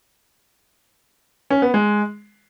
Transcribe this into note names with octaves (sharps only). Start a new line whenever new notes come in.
C#4
B3
G#3